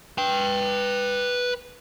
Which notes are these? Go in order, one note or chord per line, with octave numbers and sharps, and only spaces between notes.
B4 G5